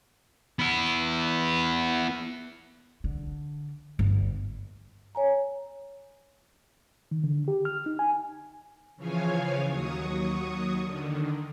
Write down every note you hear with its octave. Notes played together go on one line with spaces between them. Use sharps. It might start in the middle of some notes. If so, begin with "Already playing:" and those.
B3 E4
D3
G1
C#5 G#5 A#5
D#3
D3
G4
F6
D#4
G#5
C#3 E3 F3 C#5 F5 G#5
D#2 F#3 C#6 D#6
D3 D#3